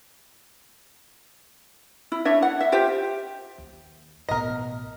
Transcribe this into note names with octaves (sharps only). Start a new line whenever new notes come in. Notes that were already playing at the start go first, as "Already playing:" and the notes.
E4
D4 C#5 E5
F#5
E5
F4 G4 C5 E5
D#2
A1 B2 A#4 D#5